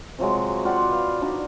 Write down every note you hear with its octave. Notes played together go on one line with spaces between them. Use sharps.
C3 F3 F#3 G#3
F4 G4 D5 F#5
B4 F5
D4 D#4 F#4